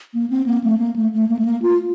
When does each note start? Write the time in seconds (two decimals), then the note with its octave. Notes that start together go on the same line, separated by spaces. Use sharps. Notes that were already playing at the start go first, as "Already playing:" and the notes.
0.14 A#3
0.30 C4
0.46 A#3
0.64 A3
0.79 A#3
0.96 A3
1.13 A3
1.29 A#3
1.39 A3
1.45 A#3
1.62 F4